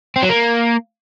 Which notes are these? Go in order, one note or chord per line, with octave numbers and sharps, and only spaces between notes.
C4
F#3
A#3